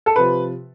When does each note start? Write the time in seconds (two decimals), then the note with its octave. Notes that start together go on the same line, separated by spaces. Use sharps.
0.06 A4
0.16 C3 F3 B4